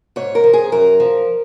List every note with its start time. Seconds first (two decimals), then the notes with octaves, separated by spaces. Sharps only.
0.16 G#2 C#5
0.35 A#4
0.44 F3
0.53 G#4
0.72 F#2 A#4
1.00 F3